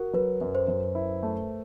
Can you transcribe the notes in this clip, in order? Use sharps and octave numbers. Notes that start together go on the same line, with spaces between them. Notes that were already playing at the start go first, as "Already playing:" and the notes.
Already playing: F#4 A#4
F#3 B4
F#2
C5
F#2
E4
A3